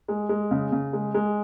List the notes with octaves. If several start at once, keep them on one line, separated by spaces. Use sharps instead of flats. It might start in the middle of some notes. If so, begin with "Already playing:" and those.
G#3
G#3
C#3
C#3
G#3
G#3